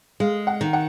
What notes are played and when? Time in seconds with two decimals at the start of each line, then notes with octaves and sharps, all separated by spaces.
0.20 G#3 F5
0.47 F#5
0.61 D#3
0.73 F#5